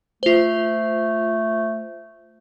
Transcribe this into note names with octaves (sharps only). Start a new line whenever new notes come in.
A3 F4 C5